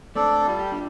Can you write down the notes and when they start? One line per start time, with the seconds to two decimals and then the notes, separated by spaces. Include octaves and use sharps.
0.16 A3 C4 D4 A4 D5
0.47 G3 F4
0.59 G4
0.72 D4 F4